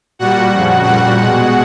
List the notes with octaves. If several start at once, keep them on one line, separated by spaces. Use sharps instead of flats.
A#2 G3 F#4 F#5
F2 C#3 F3
A#2 G3 F#4 F#5
B2 G#3